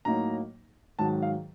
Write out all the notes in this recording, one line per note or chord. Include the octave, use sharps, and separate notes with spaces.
A2 F#3 A#3 D#4 A#5
G#2 D#3 F#3 A5
F5